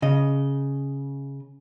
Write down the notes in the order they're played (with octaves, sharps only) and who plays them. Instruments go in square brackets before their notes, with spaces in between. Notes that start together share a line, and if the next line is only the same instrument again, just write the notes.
[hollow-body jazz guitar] C#3 D#5